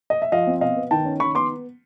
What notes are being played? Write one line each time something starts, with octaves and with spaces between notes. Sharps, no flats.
D#5
E5
F3 D#5 F5
C4
B2 D#5 F5
B3
D#3 G5 A5
C#4
D#3 B5 C#6
B3 C6 D6